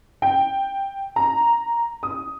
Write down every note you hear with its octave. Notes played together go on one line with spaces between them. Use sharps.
G5
A#5
D#6